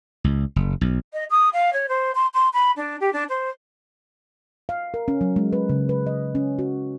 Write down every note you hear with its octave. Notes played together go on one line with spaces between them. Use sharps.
C#2
F#1
B1
D#5
D#6
F5
C#5
C5
C6
C6
B5
D4
G4
D4
C5
F5
A#4
C#4
F#3
G#3
B4
C#3
B4
D#5
C#4
F#4